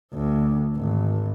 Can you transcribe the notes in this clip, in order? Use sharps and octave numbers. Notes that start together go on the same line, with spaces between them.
D2
G#1